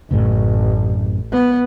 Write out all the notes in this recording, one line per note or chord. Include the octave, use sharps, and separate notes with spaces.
A1 F#2 A2 C#3
B3